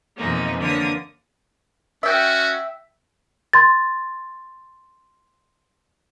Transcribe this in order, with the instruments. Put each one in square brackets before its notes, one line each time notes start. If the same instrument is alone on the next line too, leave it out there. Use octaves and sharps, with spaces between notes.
[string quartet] F2 B2 E3 G#3 A#3 D#4
D3 E3 A#3 C#5 D#6
[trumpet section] C#4 F#4 [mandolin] E5 G5
[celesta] C6 A6